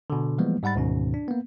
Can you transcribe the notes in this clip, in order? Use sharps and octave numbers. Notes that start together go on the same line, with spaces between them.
B2 D3
E3 F3 G3 G#3 A#3 B3
G#2 G3 F#5 B5 A6
D2 G#2 B2 D#3 C#4
D4
A#3 B3